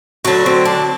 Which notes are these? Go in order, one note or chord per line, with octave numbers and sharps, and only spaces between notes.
D2 D3 F#3 F#4
C4
D4